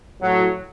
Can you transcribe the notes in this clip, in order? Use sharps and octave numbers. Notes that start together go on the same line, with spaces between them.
A2 F#3